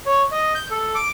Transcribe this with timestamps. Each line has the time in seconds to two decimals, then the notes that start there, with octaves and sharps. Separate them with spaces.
0.06 C#5
0.32 D#5
0.55 G6
0.71 A4
0.95 D6